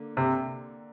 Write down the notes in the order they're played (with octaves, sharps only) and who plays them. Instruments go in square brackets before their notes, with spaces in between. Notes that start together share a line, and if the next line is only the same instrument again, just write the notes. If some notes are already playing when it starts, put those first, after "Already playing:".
Already playing: [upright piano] D3 A#3
[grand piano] C3